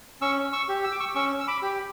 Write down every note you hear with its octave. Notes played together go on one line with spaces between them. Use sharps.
C#4 C#6 E6
C#6 E6
G4
E6
D6
C#6 E6
C#4 C#6 E6
E6
B5 D6
G4